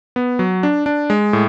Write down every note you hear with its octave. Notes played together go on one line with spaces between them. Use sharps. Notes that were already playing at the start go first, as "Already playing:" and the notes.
B3
F#3
D4
D4
G#3
A2